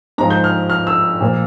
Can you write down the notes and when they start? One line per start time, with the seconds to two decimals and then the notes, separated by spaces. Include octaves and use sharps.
0.18 G#2 F3 G#3 A#5
0.30 G6
0.44 F6
0.70 F6
0.87 E6
1.21 A#2 F3 A#3